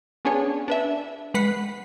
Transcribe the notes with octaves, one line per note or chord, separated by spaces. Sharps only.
B3 C#4 D4 G#4 C#5
D4 B4 E5
G#3 B4 F#5 B5 B6 C7